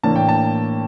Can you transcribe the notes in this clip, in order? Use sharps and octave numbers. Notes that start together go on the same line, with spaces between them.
A2 E3 A#3 D4 A5
G5
A5